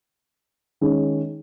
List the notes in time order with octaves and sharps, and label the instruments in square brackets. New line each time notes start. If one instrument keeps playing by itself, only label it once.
[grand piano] D#3 G#3 C#4